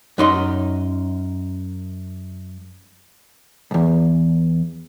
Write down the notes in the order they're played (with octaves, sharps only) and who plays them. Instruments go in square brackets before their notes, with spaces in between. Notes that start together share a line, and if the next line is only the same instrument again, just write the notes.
[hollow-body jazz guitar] F#2 D#4 C6
B1 E2